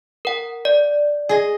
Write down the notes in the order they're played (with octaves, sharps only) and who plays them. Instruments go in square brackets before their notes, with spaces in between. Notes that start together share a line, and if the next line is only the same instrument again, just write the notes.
[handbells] A#4 F#5
D5
[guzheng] G#4 D#5